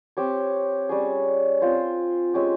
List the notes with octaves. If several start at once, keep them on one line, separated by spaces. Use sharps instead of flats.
C4 G4 C#5
G3 C#4 G#4
C4 F4 C5
G#3 C#4 G4